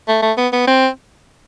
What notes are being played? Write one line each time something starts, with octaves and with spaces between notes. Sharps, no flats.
A3
A3
B3
B3
C4